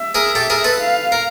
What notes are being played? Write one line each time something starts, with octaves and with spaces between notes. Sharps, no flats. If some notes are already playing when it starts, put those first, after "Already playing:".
Already playing: E5
G#4 A#4
G4 A4
G#4 A#4
A4 B4
F5
A#4